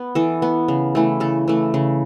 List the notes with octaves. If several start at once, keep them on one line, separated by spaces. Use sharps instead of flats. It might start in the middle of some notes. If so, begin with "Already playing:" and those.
Already playing: B3
E3 A4
B3
C#3
E3 A3
C#3 A4
E3 A3
C#3